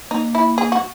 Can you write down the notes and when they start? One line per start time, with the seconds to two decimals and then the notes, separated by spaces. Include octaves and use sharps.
0.11 A#3 D#4
0.35 E4
0.58 G#4
0.72 F#4